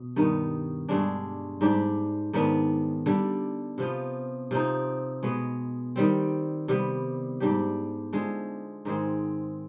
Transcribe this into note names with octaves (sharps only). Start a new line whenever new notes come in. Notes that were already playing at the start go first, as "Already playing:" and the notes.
Already playing: B2
G2 D#3 B3 D#4
G2 D3 G#3 D4
G#2 G3 D4 G4
G#2 D#3 B3 D4
D3 G3 D4
C3 F3 B3 F4
C3 F3 C4 D#4
B2 G#3 B3
D#3 G3 C4
C3 G3 B3
G#2 G3 D4 G4
D3 F3 G#3
G#2 D#3 G#3 C4